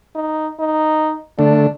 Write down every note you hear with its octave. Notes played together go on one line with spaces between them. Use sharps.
D#4
D#4
D3 A3 D4